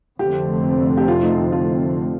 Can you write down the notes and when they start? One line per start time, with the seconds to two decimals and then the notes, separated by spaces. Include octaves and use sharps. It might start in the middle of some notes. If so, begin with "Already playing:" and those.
0.19 F1 F2 D3 A3 C4 G4
0.97 G4
1.08 F4
1.23 D#4
1.38 F4
1.52 F4